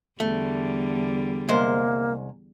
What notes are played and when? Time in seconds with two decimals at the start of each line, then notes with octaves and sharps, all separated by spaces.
0.20 E2 D3 G3 A3
1.49 C2 G#3 A#3 C5